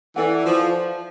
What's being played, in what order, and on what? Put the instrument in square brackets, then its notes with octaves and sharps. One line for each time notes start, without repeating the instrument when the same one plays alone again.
[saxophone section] E3 [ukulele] E4 A4 D5 F#5
[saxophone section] F3